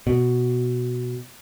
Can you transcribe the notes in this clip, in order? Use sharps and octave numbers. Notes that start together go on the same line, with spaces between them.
B2